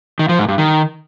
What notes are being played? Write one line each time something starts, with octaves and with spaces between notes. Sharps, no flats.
D#3
F3
G#2
G2
D#3